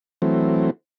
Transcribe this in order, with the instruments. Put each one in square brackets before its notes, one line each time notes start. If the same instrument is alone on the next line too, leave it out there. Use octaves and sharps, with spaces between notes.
[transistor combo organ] E3 F#3 A3 C4